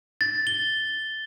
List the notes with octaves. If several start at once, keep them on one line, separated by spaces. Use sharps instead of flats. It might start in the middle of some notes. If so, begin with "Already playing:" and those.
A6
G7